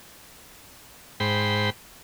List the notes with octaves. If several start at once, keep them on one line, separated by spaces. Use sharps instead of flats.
G#2 C5 G5 B5